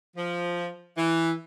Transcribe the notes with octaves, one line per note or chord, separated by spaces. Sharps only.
F3
E3